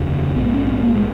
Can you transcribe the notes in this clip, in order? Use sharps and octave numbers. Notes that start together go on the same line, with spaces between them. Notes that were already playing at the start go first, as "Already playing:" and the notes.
Already playing: F1 D#2 C#3
A#1 G#2 B3
B3
C#4
C#4
B3
A#3
G#3